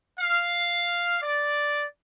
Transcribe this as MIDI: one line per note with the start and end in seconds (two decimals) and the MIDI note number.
0.18 1.21 77
1.21 1.83 74